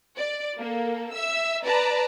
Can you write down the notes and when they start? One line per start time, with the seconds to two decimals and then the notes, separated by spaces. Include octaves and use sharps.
0.16 D5
0.58 A#3 A4
1.13 E5 E6
1.64 B4 D5 A5 A#5